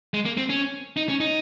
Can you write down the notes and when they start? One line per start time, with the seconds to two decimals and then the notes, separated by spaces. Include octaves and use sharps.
0.14 G#3
0.26 A#3
0.37 C4
0.50 C#4
0.97 D#4
1.09 C#4
1.21 D#4